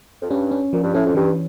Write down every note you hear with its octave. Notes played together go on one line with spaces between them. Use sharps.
F2
G2 C#4
C#4
A#2 F3
G2
A2 C#4
F2
G2 E3